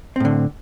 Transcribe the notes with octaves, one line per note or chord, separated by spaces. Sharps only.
A2 D3 C4